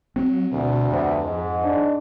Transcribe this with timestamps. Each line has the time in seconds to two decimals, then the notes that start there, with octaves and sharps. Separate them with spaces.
0.16 F#3 C4
0.51 D2 B2
0.91 F2 C3 A3 B3
1.24 G#2
1.63 D4